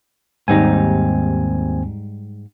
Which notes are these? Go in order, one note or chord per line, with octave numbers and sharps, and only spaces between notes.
D#2 G#2 G3 C4 D#4 G#5